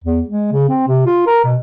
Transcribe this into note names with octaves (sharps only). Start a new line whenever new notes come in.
E2
G#3
C#3
C4
C3
F4
A#4
B2